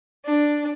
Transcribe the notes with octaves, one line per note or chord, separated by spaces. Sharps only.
D4